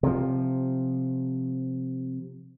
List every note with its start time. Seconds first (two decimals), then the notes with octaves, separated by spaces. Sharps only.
0.03 C3 F3